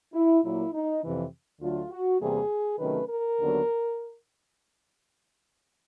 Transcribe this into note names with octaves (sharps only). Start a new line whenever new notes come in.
E4
A#2 F#3 A#3 E4
D#4
F2 C3 E3
D2 D3 F#3 A3 F4
F#4
E2 C3 E3 G3 A#3 G#4
C3 D#3 F#3 A3 C#4 B4
A#4
D#2 D3 F#3 B3